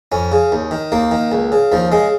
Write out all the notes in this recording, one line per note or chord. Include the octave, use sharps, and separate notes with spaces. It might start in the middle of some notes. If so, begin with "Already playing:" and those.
F2 C#4
C#3
D#2
D#3
D#2 A#3
D#3
C#2
C#3
D#2 F3
C#3 G#3